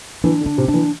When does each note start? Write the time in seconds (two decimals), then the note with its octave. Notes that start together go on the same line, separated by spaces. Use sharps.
0.24 E3 D4
0.41 D3
0.46 D4
0.58 C3
0.68 D4
0.74 E3